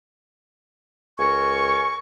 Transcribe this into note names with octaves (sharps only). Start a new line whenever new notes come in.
C#2 A#4 G#5 C#6